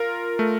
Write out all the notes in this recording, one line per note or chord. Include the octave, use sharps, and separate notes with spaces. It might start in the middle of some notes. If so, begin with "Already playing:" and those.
Already playing: F4 A#4
A3